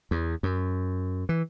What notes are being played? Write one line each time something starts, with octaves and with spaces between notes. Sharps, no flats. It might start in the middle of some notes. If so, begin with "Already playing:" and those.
E2
F#2
E3